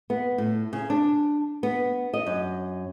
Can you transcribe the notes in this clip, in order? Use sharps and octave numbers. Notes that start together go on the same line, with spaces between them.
B3
A2
C#3
D4
B3
D#5
F#2